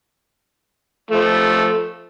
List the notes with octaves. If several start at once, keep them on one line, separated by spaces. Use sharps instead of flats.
F3 A3